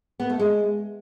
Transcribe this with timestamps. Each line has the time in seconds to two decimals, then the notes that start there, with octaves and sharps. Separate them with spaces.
0.20 B3
0.29 A3
0.39 G#3